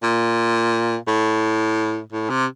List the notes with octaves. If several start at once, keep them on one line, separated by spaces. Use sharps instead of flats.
A#2
A2
A2
C3